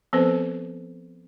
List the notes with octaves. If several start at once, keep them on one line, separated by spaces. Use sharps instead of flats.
F3 B3 C4 A4 B4 C5